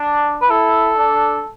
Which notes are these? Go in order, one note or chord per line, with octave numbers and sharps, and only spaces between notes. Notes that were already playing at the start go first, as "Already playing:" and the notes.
Already playing: D4
B4
E4 A4
D4